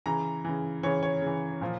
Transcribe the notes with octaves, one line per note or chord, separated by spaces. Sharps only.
C#3 E3 A#5
C#3 E3
C#3 E3 C#5
C#5
C#3 E3
A#2 F3